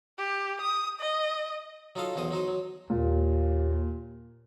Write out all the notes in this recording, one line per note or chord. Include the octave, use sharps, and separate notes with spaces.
G4
D#6
D#5
F#3 D#4 F4 A4 F5 D#6
B1 E2 F#4 C5 D#6
F#3 D#4 F#4 C5
F#3
D#2 A#2